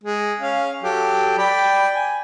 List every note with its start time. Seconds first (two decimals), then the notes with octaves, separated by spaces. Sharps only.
0.03 G#3
0.40 C#4 F5
0.83 F#3 G4 A4
1.38 D5 G5 B5
1.95 G#5